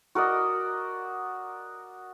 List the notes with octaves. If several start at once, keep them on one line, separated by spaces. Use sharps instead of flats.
F#4 A#4 D5 D#5